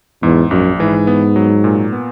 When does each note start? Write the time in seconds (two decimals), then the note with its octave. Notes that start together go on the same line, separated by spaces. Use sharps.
0.23 E2 G#2
0.51 A#1 F#2
0.80 G#2 E3
1.07 B3
1.36 F#3
1.64 A#2
1.92 B3